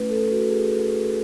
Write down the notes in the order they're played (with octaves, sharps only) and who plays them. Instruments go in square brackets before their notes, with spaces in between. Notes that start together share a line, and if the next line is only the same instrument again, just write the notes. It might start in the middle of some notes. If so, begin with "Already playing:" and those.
Already playing: [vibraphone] A3 C#4 E4 B4
A4
F#4
G#4